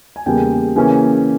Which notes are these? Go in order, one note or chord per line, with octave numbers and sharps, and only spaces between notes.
G#5
E2 C#3 G3 A#3 G5
C#3 E3 A#3 C#4